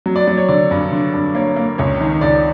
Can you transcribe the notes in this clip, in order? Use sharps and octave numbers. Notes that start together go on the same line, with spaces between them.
F#3
D5
F#3 D5
C#5
D3 D5
G2
D3
G2
A#3 C#5
A#3
C#2 C#5
D#3
C#2 D5